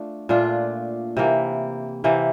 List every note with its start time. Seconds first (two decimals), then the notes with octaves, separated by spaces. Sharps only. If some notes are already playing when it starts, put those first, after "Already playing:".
Already playing: A3 D4 F4
0.29 A#2 A3 D4 F4
1.17 C3 E3 A#3
2.04 C3 E3 A#3